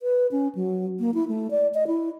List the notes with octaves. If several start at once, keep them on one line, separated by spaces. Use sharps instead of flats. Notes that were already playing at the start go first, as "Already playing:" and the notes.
B4
C#4
F#3
A#3
E4
A3
D5
D#5
E4